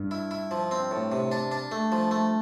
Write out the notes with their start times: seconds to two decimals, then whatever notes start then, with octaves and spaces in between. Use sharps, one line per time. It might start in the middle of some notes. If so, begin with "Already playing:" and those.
Already playing: G2
0.11 E4
0.31 E4
0.51 F3
0.71 C4
0.91 A2
1.12 C3
1.32 D4
1.51 D4
1.72 A3
1.92 F3
2.11 A3